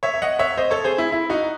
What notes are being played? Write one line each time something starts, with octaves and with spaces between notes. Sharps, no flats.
C#5 E5
E5
D#5 F#5
C#5 E5
C5 D#5
A4 C#5
G#4 C5
E4
E4
D#4 F#4